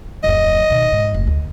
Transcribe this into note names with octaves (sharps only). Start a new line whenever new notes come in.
D1 F2 D#5
B2 D#3
G#2
F1
D2